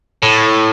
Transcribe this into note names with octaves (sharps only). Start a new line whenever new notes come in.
A2